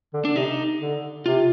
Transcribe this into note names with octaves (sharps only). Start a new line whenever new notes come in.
D3
D4
C3 D#4
D3
C3 F4